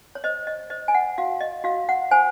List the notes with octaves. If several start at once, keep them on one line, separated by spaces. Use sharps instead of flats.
C#5
C5 D#5
D#5
C5 D#5
G#5
F#5
F#4 F5
D#5
F#4 F5
F#5
C5 G#5